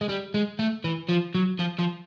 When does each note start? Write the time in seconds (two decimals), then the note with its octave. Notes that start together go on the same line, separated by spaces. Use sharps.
0.01 G#3
0.09 G3
0.34 G#3
0.59 A3
0.84 E3
1.09 F3
1.35 F#3
1.59 F3
1.79 F3